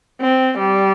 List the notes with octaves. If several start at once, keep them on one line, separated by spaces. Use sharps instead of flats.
C4
G3